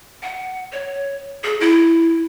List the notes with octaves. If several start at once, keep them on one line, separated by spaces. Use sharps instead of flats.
F#5
C#5
G#4
E4